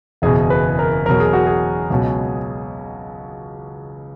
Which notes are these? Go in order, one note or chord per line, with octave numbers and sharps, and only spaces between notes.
F#1 E2 B2 G#4
B4
A#4
E2 B2 F#3 A#4
G#4
F#4
G#4
C#2 B2 F#3